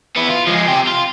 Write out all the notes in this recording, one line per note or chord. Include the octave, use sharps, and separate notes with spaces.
B3 E4
F4
F3 G#3
C3 G5
F4